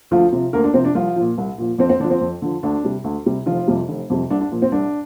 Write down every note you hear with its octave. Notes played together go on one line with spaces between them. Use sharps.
D2 F3 F4
C3 F3
D2 A#3 A#4
D4
C3 F3 C4
D4
C2 F3 F4
A#2 F3
C2
A#2 F3
F2 C4
C4
D3 F3 D4
C4
F2
D3 F3
D2 D4
C3 G3
D2
C3 G3
F1 F3 F4
F2 C3 G3
F1
F2 C3 G3
C2 D4
D4
A#2 F3
C4
C2 D4